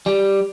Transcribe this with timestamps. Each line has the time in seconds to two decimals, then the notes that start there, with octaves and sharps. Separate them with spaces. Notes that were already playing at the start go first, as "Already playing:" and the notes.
0.06 G3